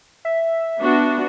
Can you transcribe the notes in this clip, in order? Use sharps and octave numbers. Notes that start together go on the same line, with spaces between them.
E5
B3 D4 F#4